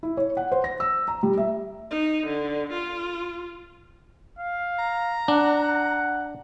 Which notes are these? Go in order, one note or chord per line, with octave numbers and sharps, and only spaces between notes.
E4
C#5
F#5
C5
A#6
E6
A#5
G3
E5
D#4
D3
F4
F5
A#5
D4 F#5